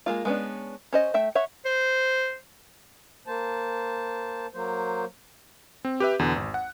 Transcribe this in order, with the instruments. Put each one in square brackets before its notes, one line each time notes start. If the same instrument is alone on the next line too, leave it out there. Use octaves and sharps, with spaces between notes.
[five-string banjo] G#3 A#3 F4
G#3 B3 C#4 D4
C#4 C5 D#5
A3 E5 G5
C#5 E5 F#5
[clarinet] C5
[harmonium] A#3 C5 A5
F#3 A#3 C5
[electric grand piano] C4
G4 B4 E5
E2 B2 D3
G#1
F#5